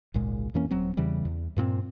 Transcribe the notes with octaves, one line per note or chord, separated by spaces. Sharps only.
G#1 C#2 A#2 G#3
F2 E3 A#3 C#4
D#1 F#3 C4
E2 C#3 E3 G3
E2
G2 A#2 B3 C4